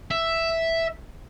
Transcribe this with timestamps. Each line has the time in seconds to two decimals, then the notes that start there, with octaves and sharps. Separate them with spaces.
0.11 E5